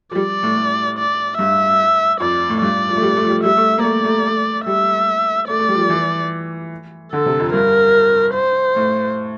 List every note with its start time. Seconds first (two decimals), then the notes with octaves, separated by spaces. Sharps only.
0.11 F3
0.15 G3 D5
0.43 A2
0.57 A2
0.98 D5
1.39 G2 E5
2.20 F2 D5
2.50 A2
2.62 G2 D5
2.89 F3
2.96 A3
3.02 G3
3.16 A3
3.24 F3
3.29 G3
3.43 G3 E5
3.57 A3
3.78 A#3
3.84 A3 D5
4.05 A3
4.26 A3
4.66 G3 E5
5.48 A3 D5
5.59 A3
5.69 G3
5.75 F3
5.79 G3
5.89 E3
7.12 D3 A4
7.26 C3
7.40 F2
7.53 G2 A#4
8.35 C5
8.76 A2